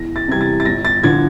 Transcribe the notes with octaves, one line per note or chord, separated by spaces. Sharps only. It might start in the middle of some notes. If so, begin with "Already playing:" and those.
Already playing: E2 A#6
A6
C3 E3 G3 G#6
A6
A6
G1 A#6
A6
D3 F3 G#6